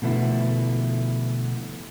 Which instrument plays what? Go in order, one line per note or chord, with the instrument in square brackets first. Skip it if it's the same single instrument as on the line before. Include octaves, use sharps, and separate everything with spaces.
[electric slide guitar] B2 D3 F3 A3 B3 E4